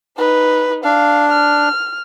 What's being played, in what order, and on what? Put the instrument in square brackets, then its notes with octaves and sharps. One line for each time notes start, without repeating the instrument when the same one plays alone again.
[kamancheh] D#4 B4
[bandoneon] D4 [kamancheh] F5
[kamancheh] F6